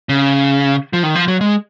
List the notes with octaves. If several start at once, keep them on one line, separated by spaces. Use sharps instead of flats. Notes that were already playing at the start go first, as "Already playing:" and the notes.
C#3
F3
D#3
F3
F#3
G#3